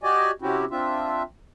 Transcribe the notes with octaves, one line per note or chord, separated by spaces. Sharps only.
F#4 G4 D5 D#5 G#5
C3 C4 C#4 E4 F#4 G4
C4 D4 F4 E5